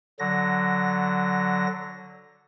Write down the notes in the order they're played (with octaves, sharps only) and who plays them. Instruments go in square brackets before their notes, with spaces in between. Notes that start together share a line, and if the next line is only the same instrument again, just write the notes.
[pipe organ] D3 F#3 A#6